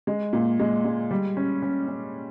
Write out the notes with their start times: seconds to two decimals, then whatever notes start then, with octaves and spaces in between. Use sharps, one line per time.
0.07 G#3
0.33 A#2
0.59 G#3
0.85 G#3
1.11 G3
1.37 C#4
1.62 C#4
1.88 C#4